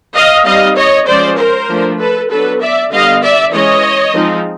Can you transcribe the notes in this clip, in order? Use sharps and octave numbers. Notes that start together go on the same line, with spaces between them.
D#5 F5
G3 C4 D#4 D#5 F5
C#5 D#5
F3 G#3 C#4 C5 D5
A#4 C5
F3 A3 D4
A4 B4
F#3 B3 D4 A4 B4
D5 E5
D3 G3 B3 D#5 F5
D5 E5
E3 G#3 C#4 C#5 D#5
F3 G#3 C4 D#4